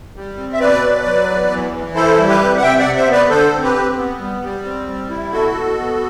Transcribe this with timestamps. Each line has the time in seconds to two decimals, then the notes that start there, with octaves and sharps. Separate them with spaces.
0.16 G3
0.37 C4
0.53 E5
0.60 B2 B4 D5
0.83 F#3
1.05 F#3
1.28 E2
1.51 E3
1.73 E3
1.95 E4 A4 C5
2.18 G3
2.28 G4 B4
2.41 C3
2.57 F#5
2.62 C3 E5 G5
2.79 D5 F#5
2.85 C3
2.96 C5 E5
3.07 B3
3.12 B4 D5
3.29 D3 A4 C5
3.53 C4
3.63 G4 B4
3.75 C4
3.97 B3
4.19 G3
4.42 G3
4.64 C4
4.88 G3
5.09 E4
5.31 B2 F#4 A4
5.54 B2
5.77 B3